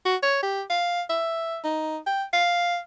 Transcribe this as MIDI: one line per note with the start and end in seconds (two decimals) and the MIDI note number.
0.05 0.16 66
0.23 0.42 73
0.43 0.62 67
0.70 1.02 77
1.10 1.58 76
1.64 1.97 63
2.07 2.23 79
2.33 2.78 77